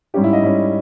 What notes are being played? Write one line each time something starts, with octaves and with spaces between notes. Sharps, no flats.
G#2 G3 C#4 G4
E4
D#5
G#2 G3 C#4